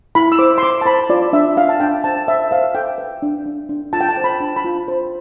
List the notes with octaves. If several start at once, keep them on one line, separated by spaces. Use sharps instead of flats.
E4 B5
E6
C5 D6
C6
C5 D6
A5
C5 B5
F4 D5
D4 E5
D4 F5
A5
D4 G5
C5 A5
C5 E5
C5 F5
A4 G5
B4
D4
D4
D4
F4 A5
G5
A5
C5
B5
D4
B5
F4
C5